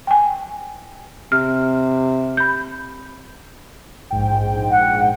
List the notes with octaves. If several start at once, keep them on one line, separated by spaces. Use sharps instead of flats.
G5 G#5
C3 F6
B5 G6
A#1 G#2 G5
F#5